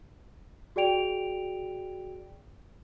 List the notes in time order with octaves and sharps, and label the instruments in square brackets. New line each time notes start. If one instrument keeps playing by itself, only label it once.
[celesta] F#4 G#4 D5 G5 D7 F7